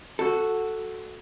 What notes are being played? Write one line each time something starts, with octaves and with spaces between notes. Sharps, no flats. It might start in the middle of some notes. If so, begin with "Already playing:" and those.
F#4 A4